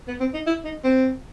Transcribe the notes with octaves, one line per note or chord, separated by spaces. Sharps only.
B3
C4
D#4
E4
D#4
C4